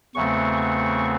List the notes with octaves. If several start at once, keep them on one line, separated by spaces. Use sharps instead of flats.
E2 C#3 F#3 A3 C4 C#6
C#6